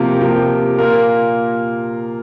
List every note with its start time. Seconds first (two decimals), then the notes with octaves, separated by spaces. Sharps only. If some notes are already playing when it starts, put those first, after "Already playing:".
Already playing: C3 F3 A#3 G4 A#4
0.21 C3 F3 A#3 G4 A#4
0.79 A#2 A#3 F4 A#4